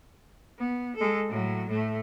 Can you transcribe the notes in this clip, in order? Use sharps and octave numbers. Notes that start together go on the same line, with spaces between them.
B3
G#3 A4
A2 F#3
A2 A3